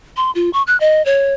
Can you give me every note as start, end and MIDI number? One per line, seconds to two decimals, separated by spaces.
0.17 0.31 84
0.35 0.50 65
0.53 0.63 85
0.67 0.78 90
0.80 1.04 75
1.05 1.34 73